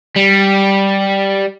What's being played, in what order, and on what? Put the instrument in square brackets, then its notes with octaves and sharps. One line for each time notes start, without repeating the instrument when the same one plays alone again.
[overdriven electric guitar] G3